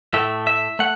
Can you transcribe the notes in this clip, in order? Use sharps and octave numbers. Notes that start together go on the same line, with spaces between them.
A2 A3 E5
E5
A3 F#5